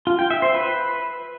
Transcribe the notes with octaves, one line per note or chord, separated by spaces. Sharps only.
F4
G5
E5
C5
B4